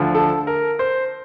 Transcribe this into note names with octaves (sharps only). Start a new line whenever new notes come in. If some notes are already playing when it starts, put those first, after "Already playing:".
Already playing: D2 D3 F3
A4
A#4
C5